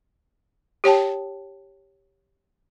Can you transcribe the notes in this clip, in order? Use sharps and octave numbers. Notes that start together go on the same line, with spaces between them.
G4 C#5 G5 A5